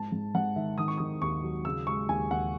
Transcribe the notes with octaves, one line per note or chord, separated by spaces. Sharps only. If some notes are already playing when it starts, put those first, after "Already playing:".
Already playing: G#2 A5
G#2
G#2 F#5
D#3 E5
D#3 D#6
C#6
D#3 D#6
D#2 C#6
F#3
C#3 E6
G#3 C#6
D#2 G#5
D#2 F#5